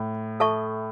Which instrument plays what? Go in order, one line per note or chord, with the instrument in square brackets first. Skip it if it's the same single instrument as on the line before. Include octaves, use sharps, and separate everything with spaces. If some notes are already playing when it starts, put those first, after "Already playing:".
Already playing: [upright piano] A2
[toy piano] A4 E5 A5 C#6